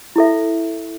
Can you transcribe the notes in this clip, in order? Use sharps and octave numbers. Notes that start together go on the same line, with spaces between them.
E4 A4 E5